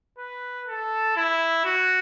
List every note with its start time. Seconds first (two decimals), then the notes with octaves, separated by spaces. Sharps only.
0.18 B4
0.68 A4
1.17 E4
1.65 F#4